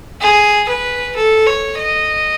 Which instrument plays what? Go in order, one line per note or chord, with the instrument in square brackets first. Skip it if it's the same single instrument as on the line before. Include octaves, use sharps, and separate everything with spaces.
[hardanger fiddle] G#4
B4
A4
C#5
D#5